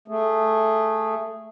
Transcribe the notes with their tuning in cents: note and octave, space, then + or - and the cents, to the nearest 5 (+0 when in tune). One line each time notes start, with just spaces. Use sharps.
A3 +0 G#4 -5